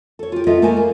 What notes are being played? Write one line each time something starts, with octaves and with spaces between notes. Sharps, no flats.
A4 C#5
F4 G4
B3 F4 A4 D#5 E5
A3 A#3 G#5
A#3